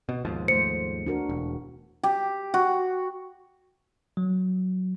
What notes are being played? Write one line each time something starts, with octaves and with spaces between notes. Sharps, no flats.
B2
D#2 G#2 F3
A3 C5 C#7
D4 F#4 A#4
E1
G4
F#4
F#3